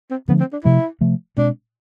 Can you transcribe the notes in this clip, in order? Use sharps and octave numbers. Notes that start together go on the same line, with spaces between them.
C4
D3 F3 A3 B3 D4
C4
D4
C3 F3 A3 E4
C3 F3 A3
B2 G#3 C4 D4